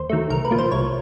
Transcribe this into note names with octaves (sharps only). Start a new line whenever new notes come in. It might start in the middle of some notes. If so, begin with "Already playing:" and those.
Already playing: D#2 C5
D#3 F#3 A3
C2 A#4
B4
A#2 F3 A#3
C5
C2 C#5